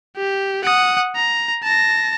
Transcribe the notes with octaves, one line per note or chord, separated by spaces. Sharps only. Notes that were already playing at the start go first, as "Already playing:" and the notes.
G4
F#5 D#6
A#5
A5 A#6